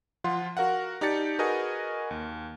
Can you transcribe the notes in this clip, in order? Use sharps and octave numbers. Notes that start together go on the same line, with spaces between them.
F3 F4 F#5 C6
F#4 A#4 F5 F#5
D#4 G4 D5 A5 A6 C#7
F#4 G#4 A#4 B4 D#5 G#5
D#2